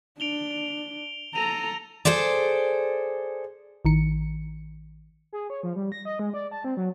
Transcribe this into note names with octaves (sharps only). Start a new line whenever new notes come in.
D4 D7 F7 G7
A4 A#5 A#6 D#7 F7
G#4 A4 C5 D5
A1 D#3 C#7
G#4
C#5
F3
G3
A#6
D#5
G#3
D5
A5
C4
F#3